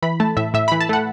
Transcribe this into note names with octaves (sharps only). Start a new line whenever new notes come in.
E3 B5
A3 A5
A2 E5
A2 E5
E3 B5
A5
A3 F#5